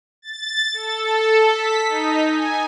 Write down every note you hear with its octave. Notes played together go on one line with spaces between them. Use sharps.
A6
A4
B6
D#4
G#5